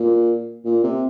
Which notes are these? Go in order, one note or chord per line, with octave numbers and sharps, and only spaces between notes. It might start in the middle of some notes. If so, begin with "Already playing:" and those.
Already playing: A#2
A#2
C3